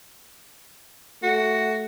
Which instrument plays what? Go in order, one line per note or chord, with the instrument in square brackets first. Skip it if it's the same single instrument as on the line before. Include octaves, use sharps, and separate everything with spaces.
[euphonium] A3 [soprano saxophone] F#4